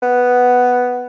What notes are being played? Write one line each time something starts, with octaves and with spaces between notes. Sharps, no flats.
B3